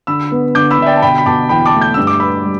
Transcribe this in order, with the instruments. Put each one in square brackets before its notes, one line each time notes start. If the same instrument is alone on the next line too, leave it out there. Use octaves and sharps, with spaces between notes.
[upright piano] D3 [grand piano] B5 E6
[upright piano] B3
[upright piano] D3 [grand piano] D6 G6
[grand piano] B5 E6
[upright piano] D3 [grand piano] E5
[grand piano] D5 G5
A5
[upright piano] B2 [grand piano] G5 B5
[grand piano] B5
[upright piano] B2 [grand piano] A5 D6
[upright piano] E2 [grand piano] G5 B5
[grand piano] A5 D6
[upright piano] A3
[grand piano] G6
[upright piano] G2 [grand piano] E6
[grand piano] D6
[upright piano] B4 [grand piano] B5 E6
[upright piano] G3